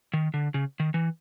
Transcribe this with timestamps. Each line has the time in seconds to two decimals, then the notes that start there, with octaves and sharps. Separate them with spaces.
0.14 D#3
0.34 D3
0.54 C#3
0.80 D#3
0.94 E3